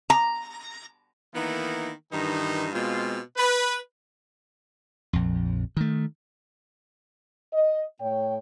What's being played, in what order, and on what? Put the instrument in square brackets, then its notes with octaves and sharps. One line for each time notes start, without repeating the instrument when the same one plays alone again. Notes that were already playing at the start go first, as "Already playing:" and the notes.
[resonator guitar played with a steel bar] A#5
[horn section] D#3 E3 A#3 B3 D#4 E4
G2 D#3 E3 D#4
B2 G#3 C4 F4
B4
[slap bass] A#1 F2
D#3 A3
[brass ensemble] D#5
A2 C#5 G5